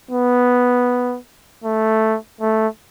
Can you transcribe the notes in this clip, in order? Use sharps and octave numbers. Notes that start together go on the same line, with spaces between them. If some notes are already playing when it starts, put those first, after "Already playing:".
B3
A3
A3